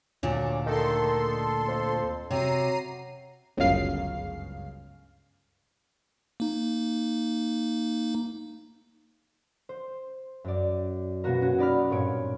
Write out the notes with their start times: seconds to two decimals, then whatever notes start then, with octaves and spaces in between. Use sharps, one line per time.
0.23 D2 A#2 C#4 D4
0.66 D#3 A4 C6
1.68 F2
2.30 C3 F#3 A#5 C7 D#7
3.57 G1 C#2 F#2 C#3 F5 C7
6.40 A#3 D#4
9.69 C5
10.44 F#2 D5
11.24 B2 A#3 B3 F#4 A#4
11.42 C#4 F#4
11.58 D#4 D5 B5 F6
11.90 G2 A#2 C4 C#5 D7